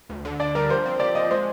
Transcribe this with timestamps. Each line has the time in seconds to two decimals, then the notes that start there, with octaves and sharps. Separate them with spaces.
0.09 D2
0.25 D3
0.40 D4 D5
0.55 G3 A#4
0.69 F3 C5
0.86 C4
1.00 G4 D5
1.15 F3 D#5
1.31 G#3 C5